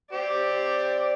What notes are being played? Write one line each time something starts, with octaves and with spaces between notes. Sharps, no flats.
G4 C5 D5